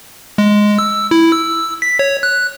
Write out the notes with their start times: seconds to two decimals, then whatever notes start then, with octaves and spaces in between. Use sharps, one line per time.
0.38 G#3
0.79 E6
1.11 E4
1.32 E6
1.82 B6
1.99 C#5
2.23 F#6